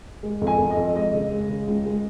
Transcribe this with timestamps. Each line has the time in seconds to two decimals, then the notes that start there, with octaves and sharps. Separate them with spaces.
0.23 G#3
0.41 F2
0.47 G#5
0.58 F2
0.71 D#5
0.77 F2
0.95 G#3 D#5
1.14 C#3
1.31 G#3
1.49 C#3
1.67 C#2
1.86 G#3